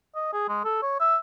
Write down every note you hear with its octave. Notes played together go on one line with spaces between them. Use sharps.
D#5
G#4
G#3
A4
C#5
E5